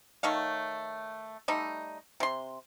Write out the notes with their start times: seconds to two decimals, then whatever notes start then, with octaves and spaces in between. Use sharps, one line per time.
0.23 D#3 A3 C#5 F5
1.48 G3 A3 D#4
2.20 C3 C6